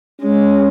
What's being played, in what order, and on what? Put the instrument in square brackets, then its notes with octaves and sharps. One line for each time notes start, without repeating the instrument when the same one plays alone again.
[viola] G#3 [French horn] C#4